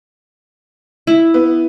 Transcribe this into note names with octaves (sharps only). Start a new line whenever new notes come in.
E4
B3